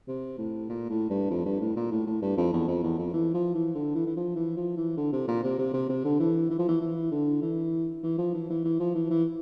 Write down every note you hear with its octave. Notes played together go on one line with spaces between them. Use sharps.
C3
A2
A#2
A2
G2
F2
G2
A2
A#2
A2
A2
G2
F2
E2
F2
E2
F2
E3
F3
E3
D3
E3
E3
F3
E3
F3
E3
D3
C3
A#2
C3
C3
C3
C3
D3
E3
E3
F3
E3
E3
D3
E3
E3
F3
E3
E3
E3
F3
E3
E3